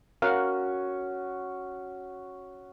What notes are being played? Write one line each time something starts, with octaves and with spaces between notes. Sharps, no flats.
C#4 F#4 A#4 F5 F#5